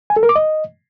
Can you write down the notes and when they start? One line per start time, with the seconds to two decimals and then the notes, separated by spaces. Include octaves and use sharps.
0.10 G#5
0.16 A4
0.23 A#4
0.29 D6
0.36 D#5